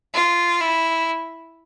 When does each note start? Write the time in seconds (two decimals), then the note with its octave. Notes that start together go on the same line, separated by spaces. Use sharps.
0.14 F4
0.61 E4